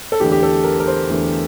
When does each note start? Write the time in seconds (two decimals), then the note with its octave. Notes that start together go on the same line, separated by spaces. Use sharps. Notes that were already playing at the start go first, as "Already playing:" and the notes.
0.12 A4
0.20 E2 D3 A3 G4
0.32 G4
0.43 A4
0.64 A#4
0.80 A#4
0.87 C5
1.09 E2 D3 A3